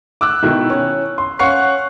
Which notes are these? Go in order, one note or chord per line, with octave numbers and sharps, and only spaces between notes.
D6 E6 F#6
B2 D#3 E4
C#4
C6
C#4 F5 F#5 C#6 F#6 C7